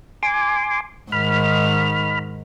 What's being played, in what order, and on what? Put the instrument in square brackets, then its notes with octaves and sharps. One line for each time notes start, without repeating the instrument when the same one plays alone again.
[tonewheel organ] G#5 C6 D6
[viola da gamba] G#2 D#3 [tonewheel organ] B5 F6